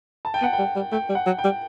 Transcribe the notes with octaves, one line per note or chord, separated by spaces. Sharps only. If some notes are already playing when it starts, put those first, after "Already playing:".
A5
G5
B3 F#5
G5
G3
G3
A3 G5
G3
F#5
F#3
G5
G3